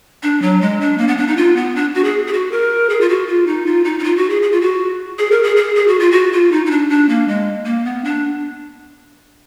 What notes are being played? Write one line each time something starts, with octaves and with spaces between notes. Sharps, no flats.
D4
F#3
G#3
D4
A#3
B3
D4
D#4
F4
B3
D4
F#4
G#4
G#4
F#4
A#4
G#4
F4
F#4
F4
D#4
F4
D#4
D#4
F4
F#4
G#4
G#4
F4
F#4
G#4
A#4
G#4
G#4
G#4
F#4
F4
F#4
F4
D#4
D#4
D4
D4
A#3
G#3
A#3
B3
D4